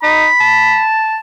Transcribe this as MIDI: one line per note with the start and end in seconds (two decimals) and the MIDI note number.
0.03 0.27 63
0.03 0.84 83
0.41 1.17 81